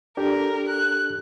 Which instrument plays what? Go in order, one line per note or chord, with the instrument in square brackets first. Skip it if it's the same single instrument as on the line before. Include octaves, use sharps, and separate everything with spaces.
[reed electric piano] D4 G4 A4 [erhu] A#4
[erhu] F#6